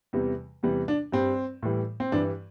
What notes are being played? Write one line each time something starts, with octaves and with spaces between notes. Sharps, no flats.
E2 C3 E3 G3
E2 C3 E3 G3
D4
G2 G3 C4
A2 E3 G3
C4
G2 E3 G3 D4